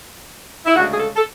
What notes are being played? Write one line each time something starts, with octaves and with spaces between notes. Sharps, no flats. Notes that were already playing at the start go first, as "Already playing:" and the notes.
E4
D2 C#3 G#3 F#4
G#4
A4
A4